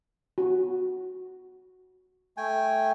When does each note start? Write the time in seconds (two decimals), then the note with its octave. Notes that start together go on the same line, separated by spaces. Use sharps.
0.38 F#4
2.37 A3 G5 G#5